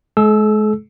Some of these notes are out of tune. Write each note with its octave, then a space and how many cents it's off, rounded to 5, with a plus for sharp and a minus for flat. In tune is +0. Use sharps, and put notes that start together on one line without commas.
G#3 +35 A4 -45 E6 +0